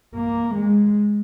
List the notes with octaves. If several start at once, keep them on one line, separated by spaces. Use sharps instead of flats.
A#3
G#3